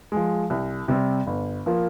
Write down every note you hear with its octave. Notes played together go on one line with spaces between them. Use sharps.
F3 G#3
C2
C3 G3 C4
G1
F3 A#3 F4